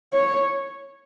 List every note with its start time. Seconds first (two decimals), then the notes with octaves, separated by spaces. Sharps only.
0.13 C#5